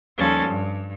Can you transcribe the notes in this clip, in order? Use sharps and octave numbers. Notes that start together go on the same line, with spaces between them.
D#2 F3 G3 C#4 A4 A6
G2